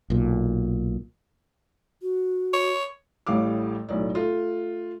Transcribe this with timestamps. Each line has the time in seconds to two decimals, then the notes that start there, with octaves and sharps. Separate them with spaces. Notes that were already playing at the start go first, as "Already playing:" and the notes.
0.10 B1 A#2
2.02 F#4
2.54 C#5
3.27 A1 A2 G3 F5 D6
3.89 B1 A2 D5
4.15 A3 F4